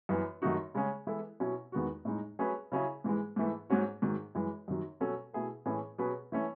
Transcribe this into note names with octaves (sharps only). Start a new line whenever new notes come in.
F#2 E3 B3
F#2 D#3 A3 D#4 F#4
C#3 G#3 C#4 G#4
E3 G#3 B3 E4 A4
B2 F#3 C#4 E4
E2 D#3 G#3 B3 F#4
A2 G#3 D#4
F#3 A3 C#4 G#4 B4
C#3 F#3 C#4 E4 G#4
G#2 E3 G#3
G#2 E3 A3
G#2 F#3 C#4 F#4
G#2 D#3 F#3
F#2 E3 G#3
F#2 D#3 F#3
B2 F#3 C#4 F#4 A4
B2 A3 E4 G#4 B4
A2 E3 A3 C#4 G#4
B2 F#3 C#4 G#4 B4
E3 A3 C#4